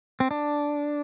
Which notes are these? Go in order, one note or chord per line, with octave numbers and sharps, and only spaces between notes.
C4
D4